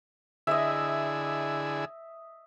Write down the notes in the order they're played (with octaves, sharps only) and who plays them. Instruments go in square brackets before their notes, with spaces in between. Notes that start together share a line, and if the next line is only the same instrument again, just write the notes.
[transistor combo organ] D3 E4 G#4 [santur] D#5 E5